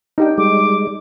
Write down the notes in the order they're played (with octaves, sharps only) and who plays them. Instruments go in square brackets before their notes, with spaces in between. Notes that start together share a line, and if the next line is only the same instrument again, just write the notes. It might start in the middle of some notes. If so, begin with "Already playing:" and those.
[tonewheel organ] D4 [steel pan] D#4 G4 G5
[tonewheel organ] G3 G#3 [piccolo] D6